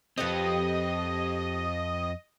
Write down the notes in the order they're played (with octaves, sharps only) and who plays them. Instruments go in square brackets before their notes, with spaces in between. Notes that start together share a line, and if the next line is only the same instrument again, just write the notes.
[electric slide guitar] F2 C4 [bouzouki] G4 A4 B4 [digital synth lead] D#5